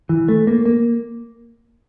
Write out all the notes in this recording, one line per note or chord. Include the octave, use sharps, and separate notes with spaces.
E3
A3
A#3
A#3